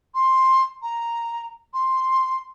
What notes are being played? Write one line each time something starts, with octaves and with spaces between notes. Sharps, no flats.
C6
A#5
C6